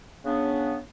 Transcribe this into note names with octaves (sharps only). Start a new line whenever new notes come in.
C#3 B3 D4